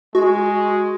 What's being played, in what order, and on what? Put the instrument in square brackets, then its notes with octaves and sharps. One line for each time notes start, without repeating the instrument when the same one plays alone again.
[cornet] G#3 [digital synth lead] F#4